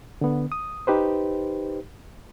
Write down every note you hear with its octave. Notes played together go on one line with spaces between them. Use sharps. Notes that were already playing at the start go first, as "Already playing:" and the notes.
D3 B3
D#6
D#4 G4 B4 C5